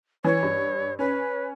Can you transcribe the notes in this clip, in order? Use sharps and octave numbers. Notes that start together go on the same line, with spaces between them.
E3 C#5
G2
C#4 B4